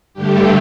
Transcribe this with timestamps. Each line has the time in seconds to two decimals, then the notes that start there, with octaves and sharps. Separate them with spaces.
0.14 G2 D3 A3 G4